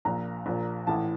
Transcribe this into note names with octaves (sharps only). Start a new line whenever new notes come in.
A#1 A#2 A#5
A#1 A#2
A1 A2 E3 A5